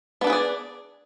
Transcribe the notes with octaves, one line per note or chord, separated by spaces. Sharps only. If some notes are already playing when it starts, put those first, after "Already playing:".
B3 D4 G#4 B4 D5